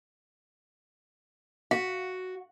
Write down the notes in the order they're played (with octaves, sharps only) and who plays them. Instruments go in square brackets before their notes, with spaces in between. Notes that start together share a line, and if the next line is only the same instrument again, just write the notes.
[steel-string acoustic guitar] F#4 [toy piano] F5